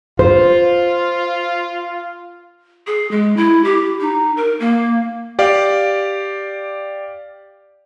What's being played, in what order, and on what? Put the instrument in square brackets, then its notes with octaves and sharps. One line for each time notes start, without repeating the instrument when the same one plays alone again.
[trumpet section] F4 [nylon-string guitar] C5
[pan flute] G#4
G#3
E4
G4
D#4
A#4
A#3
[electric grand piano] G4 D5 F5